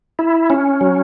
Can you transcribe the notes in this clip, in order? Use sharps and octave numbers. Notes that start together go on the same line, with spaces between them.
E4
C#4
F#3